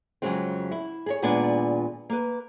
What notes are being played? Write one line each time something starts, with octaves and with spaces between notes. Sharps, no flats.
F2 G#2 C#3 F#3 G#3 C4
E4
G#4 A#4 C#5
D#2 A#2 G#3 B3 D4 G#5
A#3 B4